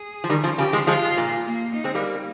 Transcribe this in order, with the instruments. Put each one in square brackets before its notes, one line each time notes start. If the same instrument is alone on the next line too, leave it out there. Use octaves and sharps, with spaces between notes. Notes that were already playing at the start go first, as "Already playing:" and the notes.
Already playing: [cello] G#4
[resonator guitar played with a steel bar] F3
D#3 G3
C#3 F3
[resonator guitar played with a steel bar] C#3 F3 [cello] G4
[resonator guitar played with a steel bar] F3 G#3
[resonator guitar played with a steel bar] F3 G#3 [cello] F4
[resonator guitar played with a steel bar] A#2
[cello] A#3
D#4
[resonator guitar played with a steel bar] G#3 C4
G3 A#3